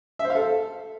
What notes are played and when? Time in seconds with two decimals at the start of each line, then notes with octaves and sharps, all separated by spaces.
0.19 E5
0.25 C5
0.30 F5
0.35 A4